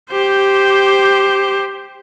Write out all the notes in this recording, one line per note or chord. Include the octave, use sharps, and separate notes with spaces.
G4 C5